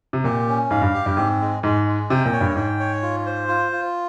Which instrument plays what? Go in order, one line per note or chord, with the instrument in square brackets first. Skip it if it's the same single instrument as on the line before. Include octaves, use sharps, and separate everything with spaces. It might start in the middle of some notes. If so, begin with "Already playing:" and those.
[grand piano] C3
[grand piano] A#2 [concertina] G4
[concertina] C#4
[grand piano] G#2 [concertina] F5
[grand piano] G2
[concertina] G4
[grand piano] G2
[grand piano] G#2 [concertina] C4
[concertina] G#3
[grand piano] G#2 [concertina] G#3
[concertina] G#3
[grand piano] C3 [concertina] G5
[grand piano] A#2
[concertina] C#5
[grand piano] G2
[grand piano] G#2 [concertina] G5
[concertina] C#5
F4
C5
F4
F4